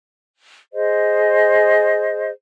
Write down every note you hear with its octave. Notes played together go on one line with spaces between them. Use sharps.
G#4 C5 D#5